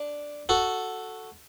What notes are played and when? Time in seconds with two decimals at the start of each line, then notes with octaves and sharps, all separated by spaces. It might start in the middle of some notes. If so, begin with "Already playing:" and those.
Already playing: D4
0.49 F#4 A4